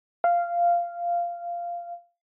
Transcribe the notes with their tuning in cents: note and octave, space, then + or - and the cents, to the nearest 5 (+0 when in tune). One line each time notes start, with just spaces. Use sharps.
F5 -10